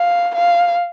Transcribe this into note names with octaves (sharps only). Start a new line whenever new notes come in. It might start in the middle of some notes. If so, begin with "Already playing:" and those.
Already playing: F5
F5